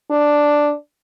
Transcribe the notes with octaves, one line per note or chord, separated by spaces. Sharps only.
D4